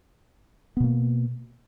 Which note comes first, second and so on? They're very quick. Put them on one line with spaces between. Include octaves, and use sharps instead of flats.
B3 B2 A#3